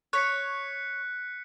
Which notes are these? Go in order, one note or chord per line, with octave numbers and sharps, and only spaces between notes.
C#5 F#6 B6 C#7